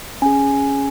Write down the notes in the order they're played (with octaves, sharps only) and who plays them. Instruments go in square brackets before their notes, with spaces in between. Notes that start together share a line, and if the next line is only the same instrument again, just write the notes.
[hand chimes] C#4 G#4 G#5